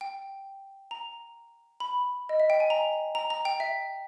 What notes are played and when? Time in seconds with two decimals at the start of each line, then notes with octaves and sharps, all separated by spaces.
0.01 G5
0.91 A#5
1.80 B5
2.29 D#5
2.40 E5
2.50 G5
2.60 G#5
2.70 A#5
3.15 A#5
3.30 A#5
3.45 G5
3.60 E5